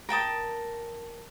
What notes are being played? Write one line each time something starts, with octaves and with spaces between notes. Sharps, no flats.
A#4 G5 A5 D#6